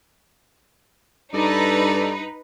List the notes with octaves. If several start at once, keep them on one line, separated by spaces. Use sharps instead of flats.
G2 D#4 A4 B4 D5